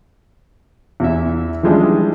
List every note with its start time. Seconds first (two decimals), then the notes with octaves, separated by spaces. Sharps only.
1.00 E2 E4 E5
1.63 E3 F3 G3 G#3 C#4 D4